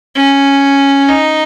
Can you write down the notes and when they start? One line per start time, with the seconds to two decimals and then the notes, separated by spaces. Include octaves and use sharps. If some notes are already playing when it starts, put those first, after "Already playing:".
0.15 C#4
1.08 D#4